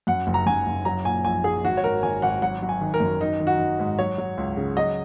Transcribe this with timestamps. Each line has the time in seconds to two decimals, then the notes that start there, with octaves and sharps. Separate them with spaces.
0.07 F#2 F#5
0.27 F#1
0.34 A#5
0.46 F#1 G#5
0.67 F#1
0.85 F#3 A#5
1.05 A#2 G#5
1.25 A#1 G#5
1.44 F#3 G#4
1.64 G#1 F#4
1.77 C#5
1.84 G#1 A#4
2.03 G#1 G#5
2.22 G#1 F#5
2.42 F#3 F#5
2.62 F#3
2.69 G#5
2.81 D#3
2.94 A#4
3.00 F#2
3.21 D#3 D#4
3.40 D#3
3.47 F#4
3.59 D#3
3.79 G#2
3.99 F#3 C#5
4.18 F#3
4.37 C#2
4.57 C#3
4.77 F#3 D#5